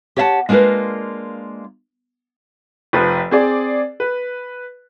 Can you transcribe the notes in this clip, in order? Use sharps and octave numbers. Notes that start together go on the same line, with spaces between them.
G4 C#5 D#5 E5 F#5 A5
G#3 A#3 D4 F4 A#4 B4
F1 F3 B4
C4 G#4 D5
B4